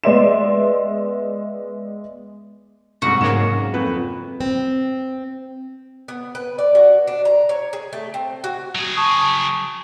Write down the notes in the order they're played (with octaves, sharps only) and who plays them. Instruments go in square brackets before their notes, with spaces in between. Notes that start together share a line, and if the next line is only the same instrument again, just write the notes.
[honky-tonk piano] G#3 B3 D5 E5 C6 E7
[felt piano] C2 G#2 [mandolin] F#4
[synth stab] G#2 F#3 A#3 [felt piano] C#3 E7
[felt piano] F2 B4 B5
[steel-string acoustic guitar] C4
[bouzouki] B3
B4
D5
F#4
D4
A#5
C#5
G#4
A3
C4
F#4
[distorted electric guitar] F#3 G#4
[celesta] A5 C#6 D#6